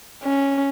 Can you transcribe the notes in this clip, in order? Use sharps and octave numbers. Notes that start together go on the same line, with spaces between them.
C#4